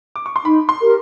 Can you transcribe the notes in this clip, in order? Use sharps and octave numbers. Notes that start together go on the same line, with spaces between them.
D6
C#6
C6
D#4 B5
C6
G4 A#4